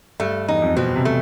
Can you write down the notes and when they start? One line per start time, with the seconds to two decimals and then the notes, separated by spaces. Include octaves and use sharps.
0.20 G2 A3
0.48 E2 D#4
0.62 F2
0.76 B2 C4
0.96 C3
1.05 A3